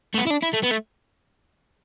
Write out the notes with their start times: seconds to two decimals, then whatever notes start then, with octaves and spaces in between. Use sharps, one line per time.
0.15 A3
0.18 B3
0.27 E4
0.31 D4
0.42 E4
0.53 A3
0.63 B3
0.71 A3